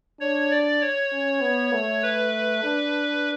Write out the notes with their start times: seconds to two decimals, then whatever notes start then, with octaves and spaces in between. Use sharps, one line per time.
0.20 D4 C#5
0.51 D5
0.82 C#5
1.12 C#4
1.42 B3
1.73 A3
2.03 B4
2.64 D4